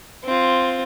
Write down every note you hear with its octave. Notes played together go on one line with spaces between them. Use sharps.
C4 F4